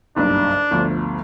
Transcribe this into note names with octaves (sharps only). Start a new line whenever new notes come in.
F#1 B1 G2 D4
G1 D2 F3